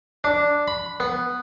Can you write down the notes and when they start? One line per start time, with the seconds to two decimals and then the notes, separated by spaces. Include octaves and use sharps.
0.24 D4
0.68 B5
1.00 B3